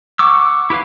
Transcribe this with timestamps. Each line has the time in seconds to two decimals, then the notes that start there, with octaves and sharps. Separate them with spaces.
0.19 F#5 C#6 D6 E6
0.70 E4 G4 B4 F5